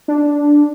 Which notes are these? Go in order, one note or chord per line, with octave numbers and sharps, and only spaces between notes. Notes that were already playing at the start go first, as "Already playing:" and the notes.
D4